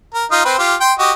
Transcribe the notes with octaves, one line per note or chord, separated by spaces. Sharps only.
A#4
D#4 F4 D#6
C4 B4 C5
F4 G4
G5 C6
F#4 G4 D#5